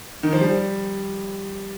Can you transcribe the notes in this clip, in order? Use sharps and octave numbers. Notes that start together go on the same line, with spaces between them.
D#3
F3
G3